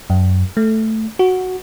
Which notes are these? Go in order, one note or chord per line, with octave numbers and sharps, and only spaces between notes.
F#2
A3
F#4